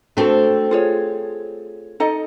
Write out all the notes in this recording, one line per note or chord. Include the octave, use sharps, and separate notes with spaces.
A3 C4 D4 F#4 A4
F4 G#4 C#5
D#4 A4 D#5